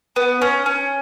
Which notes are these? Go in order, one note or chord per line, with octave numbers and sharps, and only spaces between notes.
B3
C#4
C#4